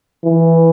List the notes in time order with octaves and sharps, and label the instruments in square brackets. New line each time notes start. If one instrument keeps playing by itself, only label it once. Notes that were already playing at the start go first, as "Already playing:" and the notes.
[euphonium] E3